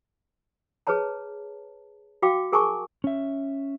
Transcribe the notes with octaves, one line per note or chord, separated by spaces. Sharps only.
G#4 B4 C#5 A5 A#5
F#4 F5 G5 D6
G#4 A#4 G#5 A5 C#6 D6
C#4 E5